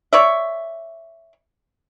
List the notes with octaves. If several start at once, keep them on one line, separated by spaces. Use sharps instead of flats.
C#5 D5 E5